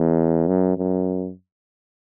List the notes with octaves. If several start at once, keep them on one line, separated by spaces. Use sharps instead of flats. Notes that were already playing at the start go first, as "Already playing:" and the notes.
Already playing: E2
F#2
F#2